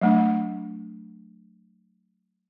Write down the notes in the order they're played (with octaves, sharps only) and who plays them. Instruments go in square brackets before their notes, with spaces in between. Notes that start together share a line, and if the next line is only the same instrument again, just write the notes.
[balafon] F#3 A3 D4